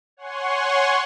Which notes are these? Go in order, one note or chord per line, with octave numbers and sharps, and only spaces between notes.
C#5 F#5 G#5 C6 C#6